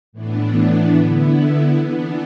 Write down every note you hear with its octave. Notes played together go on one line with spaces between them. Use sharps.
A2 E3 B3 D4
D3 B3 E4
E3 B3 D4